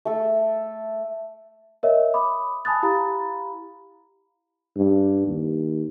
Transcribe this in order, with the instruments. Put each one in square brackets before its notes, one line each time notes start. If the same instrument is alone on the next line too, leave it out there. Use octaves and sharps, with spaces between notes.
[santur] A3 A4
[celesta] A#4 C#5 D#5 E5
B5 D6 D#6
G#5 A5 B5 D#6 F#6 A6
E4 G4 F5 A#5 B5
[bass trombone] G2
D#2